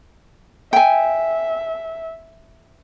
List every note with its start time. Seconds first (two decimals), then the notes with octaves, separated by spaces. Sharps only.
0.73 E5 G5 G#5